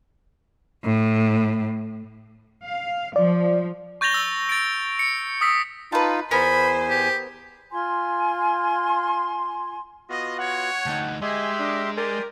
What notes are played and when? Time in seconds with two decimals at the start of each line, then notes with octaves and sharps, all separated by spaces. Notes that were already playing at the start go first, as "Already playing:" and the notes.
0.84 A2
2.65 F5
3.16 F3 D5
4.01 C#6 G6 A6 A#6 F7 G7
4.14 E6
4.49 A6 D7
4.99 C#7
5.41 D#6 E6 B6
5.92 D#4 F4 B4 A5
6.31 E2 B3 A#4 C5 G#5 B5
6.90 G4
7.70 F4 G#5 C6
10.10 B3 F4 F#4 D#5
10.39 C#5 F#5
10.86 D2 D#4 G5 A5
11.22 G#3 G4 D#5 E5 G#5 C6
11.59 D4 A#4
11.97 G4 A#4 D5 G#5 C6